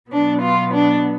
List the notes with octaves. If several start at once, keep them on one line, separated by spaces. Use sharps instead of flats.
B2 F#3 B3 D4
F4
D4